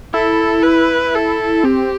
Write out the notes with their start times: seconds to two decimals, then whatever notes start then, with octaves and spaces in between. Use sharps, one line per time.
0.14 E4 A4
0.63 B4
1.15 A4
1.64 C4 G4